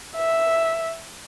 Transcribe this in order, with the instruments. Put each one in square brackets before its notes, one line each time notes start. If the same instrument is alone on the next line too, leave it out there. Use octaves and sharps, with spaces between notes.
[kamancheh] E5